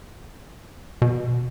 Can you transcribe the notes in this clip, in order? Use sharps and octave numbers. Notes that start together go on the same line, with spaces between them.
B2